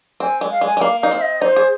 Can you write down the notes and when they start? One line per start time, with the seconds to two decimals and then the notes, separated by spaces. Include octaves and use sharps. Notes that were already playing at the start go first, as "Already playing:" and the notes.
0.20 C4 G#5
0.41 G#3
0.51 F5
0.61 G#3 G#5
0.77 G#3
0.81 A#3 F5
1.01 D#4 F5
1.11 C4
1.21 D#5
1.42 D#4 C5
1.56 G#4